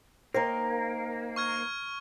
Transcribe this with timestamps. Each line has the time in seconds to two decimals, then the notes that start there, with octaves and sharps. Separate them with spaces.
0.34 A#3 D#4 A#4 C5 G5 A#5
1.36 C#6 F6 G#6